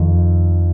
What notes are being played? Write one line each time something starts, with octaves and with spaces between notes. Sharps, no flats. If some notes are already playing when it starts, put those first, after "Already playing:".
Already playing: F2 D#3